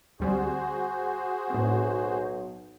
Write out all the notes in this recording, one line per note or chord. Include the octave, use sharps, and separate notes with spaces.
D2 G3 C4 F#4 G#4 C5
B1 A2 C4